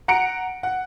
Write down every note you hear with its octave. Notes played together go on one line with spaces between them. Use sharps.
F#5 A#5 C#7 D7
F#5